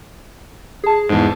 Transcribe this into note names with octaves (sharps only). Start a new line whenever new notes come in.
G#4 A5
E2 G#2